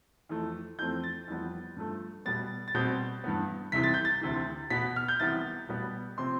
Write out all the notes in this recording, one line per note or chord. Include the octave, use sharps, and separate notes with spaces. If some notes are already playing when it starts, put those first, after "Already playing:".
F2 E3 A3
F2 E3 A3 C4 G6
A6
F2 E3 G3 B3
G2 F3 A3
B2 G3 B3 A6
A6
B2 G3 C4 G6
G2 E3 B3
C2 C3 E3 B6
A6
G6
A6
D2 C3 E3
B2 B3 B6
F6
G6
C2 C3 E3 B3 A6
B2 G3 B3
C3 F3 C4 C6